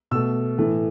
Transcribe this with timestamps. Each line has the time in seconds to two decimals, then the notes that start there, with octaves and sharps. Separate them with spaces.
0.11 B2 A3 E6
0.58 A2 E3 A3